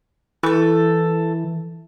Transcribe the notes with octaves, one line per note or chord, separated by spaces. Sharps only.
E3 A3 A4